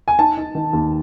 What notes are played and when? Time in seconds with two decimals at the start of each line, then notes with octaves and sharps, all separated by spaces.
0.08 G#5
0.19 D#4 A5
0.37 D#4
0.55 D#3
0.73 D#2